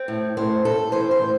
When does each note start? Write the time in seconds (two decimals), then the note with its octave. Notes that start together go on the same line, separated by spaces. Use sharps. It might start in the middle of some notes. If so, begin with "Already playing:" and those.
Already playing: C4
0.08 A2
0.37 A2 C5
0.65 A2 A4
0.92 E3 C5
1.11 C5
1.21 A2